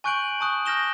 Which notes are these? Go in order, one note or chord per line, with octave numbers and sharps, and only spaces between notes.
G#5 C#6 F#6 G6 D7 F#7
A5 C#6 D#6 F#6
F6 G6 A#6 E7 G7